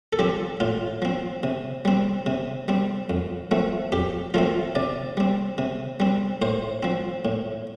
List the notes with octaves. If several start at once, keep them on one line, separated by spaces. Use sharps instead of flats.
A4
F3 C4 G4
A2 F4
F3 C4
C3
G3 C4
C3
G3 C4
F2
F3 A3 C4
F2 G4
F3 A3 C4 F4
C3 D5
G3 C4
C3
G3 C4
A2 C5
F3 C4
A2